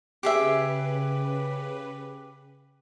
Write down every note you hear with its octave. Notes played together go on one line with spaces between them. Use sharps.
C#3 G4 G#4 B4 E5